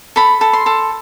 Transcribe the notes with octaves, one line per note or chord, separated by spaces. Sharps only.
A4 B5
A4
C6
A4